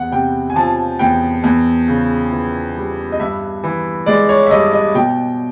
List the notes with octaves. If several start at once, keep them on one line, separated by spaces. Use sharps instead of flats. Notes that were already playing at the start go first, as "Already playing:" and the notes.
Already playing: E2 F#5
C3 G5
G#5
F3 A5
E2 G5
E2
C#3
E3
G3
D#5
G2 E5
E3
G#3 D5
C#5
E5
G2 D#5
D#5
B2 G5